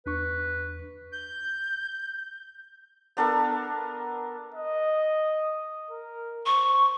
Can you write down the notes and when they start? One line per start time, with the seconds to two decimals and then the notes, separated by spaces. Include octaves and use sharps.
0.06 E2 D4 B4 C#6
1.12 G6
3.17 B3 D4 A4 A#4
4.55 D#5
5.90 A#4
6.45 C5 C#6